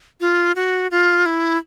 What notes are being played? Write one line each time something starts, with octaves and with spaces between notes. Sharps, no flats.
F4
F#4
F4
E4